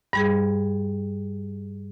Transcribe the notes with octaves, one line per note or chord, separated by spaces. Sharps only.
G2 G3 G#4